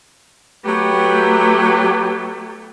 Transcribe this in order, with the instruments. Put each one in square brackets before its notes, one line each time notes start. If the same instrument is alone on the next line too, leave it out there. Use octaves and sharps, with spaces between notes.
[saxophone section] F#3 B3 G4 [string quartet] A3